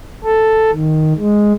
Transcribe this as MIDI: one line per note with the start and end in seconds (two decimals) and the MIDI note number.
0.24 0.71 69
0.72 1.13 51
1.19 1.53 56